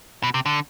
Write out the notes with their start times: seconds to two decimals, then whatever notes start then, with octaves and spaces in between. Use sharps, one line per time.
0.23 B2
0.34 C3
0.46 D3